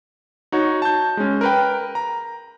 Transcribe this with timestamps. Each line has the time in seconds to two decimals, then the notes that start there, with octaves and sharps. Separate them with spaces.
0.52 D#4 F#4 C#5
0.82 A5 G6
1.17 G#3 C#4
1.41 A#4 B4 G5
1.95 A#5